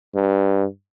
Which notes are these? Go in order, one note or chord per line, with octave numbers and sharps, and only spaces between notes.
G2